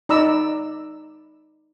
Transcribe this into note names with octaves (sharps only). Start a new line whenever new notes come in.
D#4 D5 A#5 B5 E6